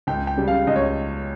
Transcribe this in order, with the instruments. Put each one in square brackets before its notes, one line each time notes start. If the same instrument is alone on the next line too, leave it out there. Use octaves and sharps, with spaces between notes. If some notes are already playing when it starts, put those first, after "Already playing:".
[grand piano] C#2 G5
G5
C#3 G3
F5
C#2 D#5
C#5